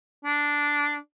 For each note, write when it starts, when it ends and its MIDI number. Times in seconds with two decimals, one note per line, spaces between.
0.24 0.97 62